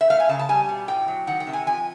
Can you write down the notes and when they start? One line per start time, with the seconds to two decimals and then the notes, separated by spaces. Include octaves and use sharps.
0.01 E5
0.10 A3 F5
0.20 G#5
0.29 C#3 A5
0.39 A5
0.49 G3 G#5
0.69 B2
0.88 A2 G5
1.08 F#3
1.27 D#3 F#5
1.40 G5
1.47 C3
1.53 G#5
1.67 F3 G#5